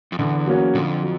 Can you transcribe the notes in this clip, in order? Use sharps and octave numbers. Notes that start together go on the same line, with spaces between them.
F2
E2 D3
F#3 A#3 C#4 F#4
F2 D3
F#3